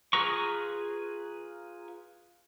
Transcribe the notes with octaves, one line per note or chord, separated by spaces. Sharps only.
F4 G#4 B4 A#5 C#6